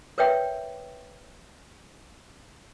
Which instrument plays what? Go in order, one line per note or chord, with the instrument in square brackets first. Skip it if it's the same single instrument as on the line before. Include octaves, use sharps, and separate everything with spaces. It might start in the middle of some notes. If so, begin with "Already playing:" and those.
[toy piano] A#4 B4 C#5 E5 G5